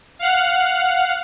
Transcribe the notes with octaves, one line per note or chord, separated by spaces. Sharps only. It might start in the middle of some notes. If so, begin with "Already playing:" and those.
F5 F#5